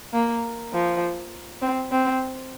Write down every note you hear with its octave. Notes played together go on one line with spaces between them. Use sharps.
A#3
F3
C4
C4